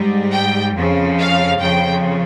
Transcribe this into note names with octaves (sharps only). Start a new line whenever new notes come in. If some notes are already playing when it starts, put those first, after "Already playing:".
Already playing: G#2 G3
G5
F2 C#3 F3
F5
F2 C#3 F3 G5